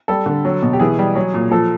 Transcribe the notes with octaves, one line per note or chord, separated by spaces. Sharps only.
G3 A4
D3
F#3
B2
G4
E3 G#4
G3
F#3
A#2
F3 A4